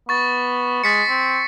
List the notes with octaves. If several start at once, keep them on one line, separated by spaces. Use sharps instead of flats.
B3 C#6 A6
G#3 A6 B6 C#7
C4